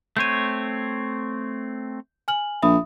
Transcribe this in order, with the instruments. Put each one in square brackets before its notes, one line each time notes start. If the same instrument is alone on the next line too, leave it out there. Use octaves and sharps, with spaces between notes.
[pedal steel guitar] A3 C4 C#5 [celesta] G6 D#7
[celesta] G#5 F6 F#7
[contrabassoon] A#1 [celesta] E5 B5 D#6